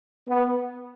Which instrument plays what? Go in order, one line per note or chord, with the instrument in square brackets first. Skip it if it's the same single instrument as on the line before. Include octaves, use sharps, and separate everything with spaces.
[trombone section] B3